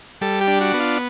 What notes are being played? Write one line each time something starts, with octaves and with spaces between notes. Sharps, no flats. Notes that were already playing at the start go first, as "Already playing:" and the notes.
G3 A4
G4
D4
F#4
B3
F4